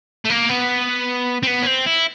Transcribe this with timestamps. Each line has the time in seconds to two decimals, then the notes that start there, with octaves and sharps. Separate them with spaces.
0.25 A3
0.30 A#3
0.49 B3
1.43 C4
1.47 B3
1.63 C#4
1.67 C4
1.87 E4